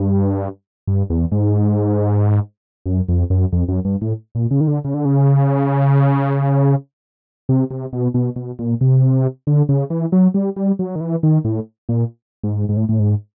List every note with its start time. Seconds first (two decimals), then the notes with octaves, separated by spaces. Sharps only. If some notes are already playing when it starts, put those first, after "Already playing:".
Already playing: G2
0.88 G2
1.10 E2
1.32 G#2
2.86 F#2
3.08 F2
3.30 F#2
3.52 F2
3.68 F#2
3.85 G2
4.02 A2
4.35 A#2
4.51 C#3
4.61 D#3
4.67 D3
4.84 C#3
4.94 D3
5.05 C#3
7.49 C3
7.70 C3
7.93 B2
8.14 B2
8.36 B2
8.59 A#2
8.81 C3
9.47 D3
9.69 C#3
9.90 E3
10.12 F#3
10.34 G3
10.56 G3
10.79 F#3
10.95 D#3
11.00 E3
11.23 D#3
11.45 A2
11.89 A#2
12.44 G#2
12.69 G#2
12.77 A2
12.89 A2
12.99 G#2